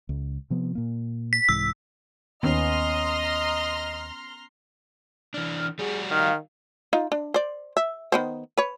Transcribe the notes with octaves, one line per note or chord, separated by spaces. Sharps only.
C#2
C3 F3 B3
A#2 A#3
B6
C2 G#2 E3 E6
D#2 B3 C#4 D#5 A#5 C6 F6
E3 D4 F6
G3 F#4 G#4
D#3 F5 F6
D#4 F4
D4
C5 D5
E5
D#3 B3 C5
B4 C#5